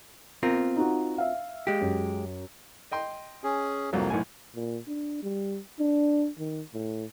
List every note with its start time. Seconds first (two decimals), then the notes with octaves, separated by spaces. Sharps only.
0.43 B3 C4 F4 A#4
0.76 D#4 F#4
1.18 E5 F5
1.67 G#3 G4
1.81 F#2
2.92 D#5 G5 C6
3.44 C#4 G#4
3.93 C2 F2 F#3 A#3
4.10 B1 A2 G#5
4.55 A#2
4.87 D4
5.23 G3
5.79 D4
6.39 D#3
6.74 A2